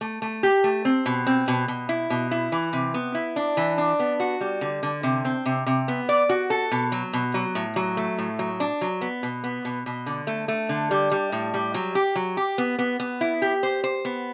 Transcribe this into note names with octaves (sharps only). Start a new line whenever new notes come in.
A3
A3
G4
A3
C4
B2
C4
B2
B2
E4
B2
E4
E3
C3
B3
E4
D4
E3
D4
B3
F#4
G3
D3
D3
C3
C4
C3
C3
B3
D5
F#4
A4
B2
F#3
B2
F#3
A2
F#3
A3
A2
F#3
D4
F#3
B3
B2
B3
B2
B2
D3
A3
A3
D3
G3
G3
A2
G3
F#3
G4
F#3
G4
B3
B3
B3
E4
G4
C5
C5
B3